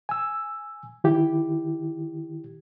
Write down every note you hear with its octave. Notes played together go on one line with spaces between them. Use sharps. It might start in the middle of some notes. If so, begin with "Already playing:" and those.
G#5 E6
D#3 E4 G4